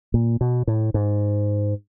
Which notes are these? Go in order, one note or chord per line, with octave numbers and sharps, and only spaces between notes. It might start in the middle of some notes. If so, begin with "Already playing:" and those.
A#2
B2
A2
G#2